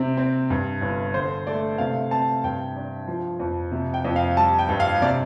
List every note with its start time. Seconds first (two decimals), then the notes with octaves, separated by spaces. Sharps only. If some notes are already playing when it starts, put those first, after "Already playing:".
Already playing: C3 C4
0.17 C4
0.50 G2
0.82 G1
1.14 D3 C5
1.47 A3 D5
1.78 C3 F5
2.11 C4 A5
2.44 G2 G5
2.76 D4
3.07 F3
3.40 F2
3.72 C3
3.94 G5
4.05 F2
4.16 F5
4.37 G3 A5
4.59 G5
4.69 G2
4.80 F5
5.02 C3 D5